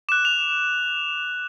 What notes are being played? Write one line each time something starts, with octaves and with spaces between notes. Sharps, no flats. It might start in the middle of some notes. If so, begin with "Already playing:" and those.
D6 F#6 E7
F7